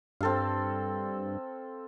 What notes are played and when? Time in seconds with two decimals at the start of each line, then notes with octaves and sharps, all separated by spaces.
0.21 G2 C4 A4 F5